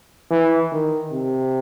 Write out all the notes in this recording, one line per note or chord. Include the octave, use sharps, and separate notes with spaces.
E3
D#3
C3